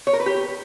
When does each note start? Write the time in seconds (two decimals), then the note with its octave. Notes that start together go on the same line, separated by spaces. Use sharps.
0.07 C#5
0.13 A#4
0.20 B4
0.26 G4